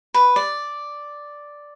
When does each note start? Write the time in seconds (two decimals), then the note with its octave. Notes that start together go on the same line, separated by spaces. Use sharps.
0.14 B4
0.36 D5